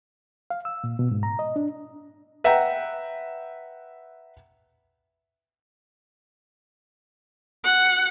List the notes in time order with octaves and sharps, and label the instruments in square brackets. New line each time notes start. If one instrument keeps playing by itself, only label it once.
[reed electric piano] F5
E6
A#2
B2
G#2
A#5
D#5
D4
[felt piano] B4 E5 F#5 G5 A#5
[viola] F#5